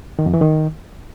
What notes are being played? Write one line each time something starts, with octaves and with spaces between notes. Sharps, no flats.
D#3
F2
E3
D#3